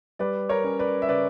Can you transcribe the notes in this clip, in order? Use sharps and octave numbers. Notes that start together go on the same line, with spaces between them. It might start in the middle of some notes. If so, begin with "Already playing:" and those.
G3 B4 D5
A#4 C#5
C#4
B4 D5
E5
C#3 B4 D5